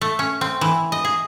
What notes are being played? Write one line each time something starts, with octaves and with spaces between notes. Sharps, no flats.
A3
C#4
C4
E3
D#5
G#4